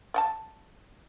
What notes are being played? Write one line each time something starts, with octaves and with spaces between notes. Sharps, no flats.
D5 F#5 A5